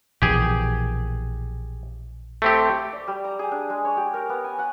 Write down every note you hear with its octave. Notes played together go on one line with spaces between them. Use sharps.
A#1 B2 E3 G4 G#4
A3 C4 G4
D5
G3
A#5
G#4
D4
G#3
C#5
G4
A#4
B3
G#5
F#5